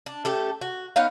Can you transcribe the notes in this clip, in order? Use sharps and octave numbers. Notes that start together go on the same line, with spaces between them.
D4
A3 C#4 G4 A4
F#4
B3 D#4 C#5 F5